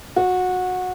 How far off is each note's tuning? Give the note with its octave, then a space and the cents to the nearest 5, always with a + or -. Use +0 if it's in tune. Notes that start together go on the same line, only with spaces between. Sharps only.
F#4 -20